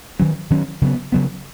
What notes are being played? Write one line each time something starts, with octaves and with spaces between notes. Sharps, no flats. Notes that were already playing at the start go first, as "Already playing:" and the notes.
D#3 F#3 C#4
D#3 F#3 C#4
C#3 F#3 B3
C#3 F#3 B3